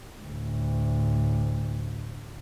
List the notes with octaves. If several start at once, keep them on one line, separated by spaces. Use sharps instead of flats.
D2 A2